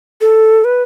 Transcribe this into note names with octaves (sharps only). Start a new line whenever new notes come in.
A4
B4